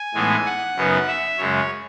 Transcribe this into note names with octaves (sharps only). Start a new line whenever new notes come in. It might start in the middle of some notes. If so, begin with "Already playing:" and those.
Already playing: G#5
A2 E3 G#3 B3 D#4
F#5
F#2 C#3 F#3 B3 D#4
E5
F#2 C#3 G#3 C#5